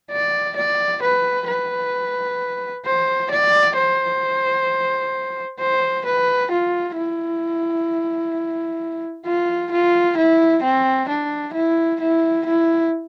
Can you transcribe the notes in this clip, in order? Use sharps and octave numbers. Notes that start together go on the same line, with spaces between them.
D5
D5
B4
B4
C5
D5
C5
C5
B4
F4
E4
F4
F4
E4
C4
D4
E4
E4
E4